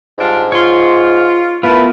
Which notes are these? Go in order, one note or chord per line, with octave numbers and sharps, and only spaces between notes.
G#2 G3 D4 F4
F4 C#5 C6
A3 B3 E4 F4 A#4 B4